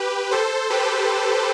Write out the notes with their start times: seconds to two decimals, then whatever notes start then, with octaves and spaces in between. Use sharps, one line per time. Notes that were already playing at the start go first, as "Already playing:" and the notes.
Already playing: G4 B4
0.31 A4 C5
0.70 G4 B4